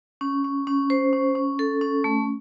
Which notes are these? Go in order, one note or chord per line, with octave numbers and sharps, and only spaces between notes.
C#4
C#4
C#4
C5
C#4
C#4
A4
C#4
A3